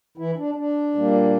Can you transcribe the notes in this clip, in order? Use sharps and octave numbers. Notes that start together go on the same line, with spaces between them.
E3 E4
D4
D4
A#2 G3 A#3